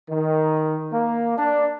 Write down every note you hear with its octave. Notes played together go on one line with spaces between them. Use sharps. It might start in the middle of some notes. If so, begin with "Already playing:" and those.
D#3
A#3
D4